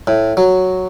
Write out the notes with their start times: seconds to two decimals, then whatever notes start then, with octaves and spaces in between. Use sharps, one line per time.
0.07 A2
0.37 F#3